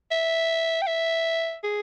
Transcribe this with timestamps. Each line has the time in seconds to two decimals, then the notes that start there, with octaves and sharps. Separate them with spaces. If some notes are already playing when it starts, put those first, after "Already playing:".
0.11 E5
0.82 G5
0.87 E5
1.63 G#4